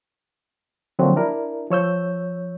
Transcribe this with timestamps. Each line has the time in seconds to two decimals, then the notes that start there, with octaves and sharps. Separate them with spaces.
0.99 D3 F3 F#3 A#3 C4 F#4
1.16 D4 E4 A#4
1.70 F3 C#5 E6 G6